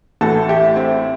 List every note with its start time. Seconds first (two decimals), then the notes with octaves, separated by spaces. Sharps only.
0.21 A1 A2 E3 F#4 A4
0.49 E4 G4
0.76 C4 E4